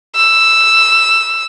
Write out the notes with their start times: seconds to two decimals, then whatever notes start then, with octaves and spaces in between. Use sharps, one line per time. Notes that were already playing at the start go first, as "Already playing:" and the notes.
0.16 E6